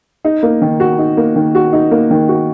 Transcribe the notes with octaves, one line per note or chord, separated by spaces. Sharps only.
D#4
A#3
D#3
F#4
D#4
A#3
D#3
F#4
D#4
A#3
D#3
F#4